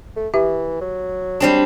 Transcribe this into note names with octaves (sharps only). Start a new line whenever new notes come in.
A3
E3 G4 E5
F#3
G3 C4 D4